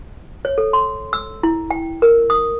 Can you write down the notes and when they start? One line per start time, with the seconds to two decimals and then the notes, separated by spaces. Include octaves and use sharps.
0.45 C#5
0.58 A4
0.73 C6
1.13 E6
1.43 E4
1.71 G5
2.02 A#4
2.30 D#6